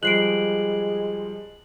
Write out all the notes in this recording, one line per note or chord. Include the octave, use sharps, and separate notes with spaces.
F3 G3 G#3 D#5 F#6 C7 D7 F#7